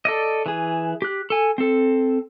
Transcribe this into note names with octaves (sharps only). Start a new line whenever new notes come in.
A4 D5 D#5
E3 G#4
G4 F#6
A4 G#5
C4 A4